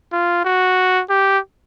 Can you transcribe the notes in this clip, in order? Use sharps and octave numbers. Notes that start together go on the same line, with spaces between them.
F4
F#4
G4